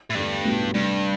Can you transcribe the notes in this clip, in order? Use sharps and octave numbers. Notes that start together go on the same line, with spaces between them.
A2
E2 G2 D3 A3 D4
B1 A2 G3 B3 F#4
D2 G2 C3 G3 D4